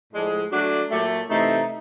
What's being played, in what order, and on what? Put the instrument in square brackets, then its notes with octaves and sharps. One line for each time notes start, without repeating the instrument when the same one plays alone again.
[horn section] A2 F3 G#3 [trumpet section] D4
[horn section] F#3 A3 D4 [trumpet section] F#4
[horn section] A#2 F#3 A3 [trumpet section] G4
[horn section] C3 E3 A3 [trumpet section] D#4